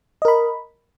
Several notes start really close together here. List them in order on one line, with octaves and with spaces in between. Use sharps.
D#5 A#4 B5